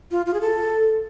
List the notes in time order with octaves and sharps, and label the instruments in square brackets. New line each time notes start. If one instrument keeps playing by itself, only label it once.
[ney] F4
F4
G#4
A4